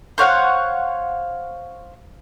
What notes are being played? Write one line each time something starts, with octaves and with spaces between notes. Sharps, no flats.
C5 C#5 F5 F#5